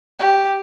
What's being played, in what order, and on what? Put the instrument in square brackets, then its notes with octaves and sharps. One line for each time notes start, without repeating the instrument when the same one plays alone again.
[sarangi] G4